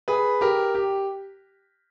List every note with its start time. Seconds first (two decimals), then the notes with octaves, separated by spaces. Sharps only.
0.08 G#4 B4
0.41 G4 A#4
0.75 G4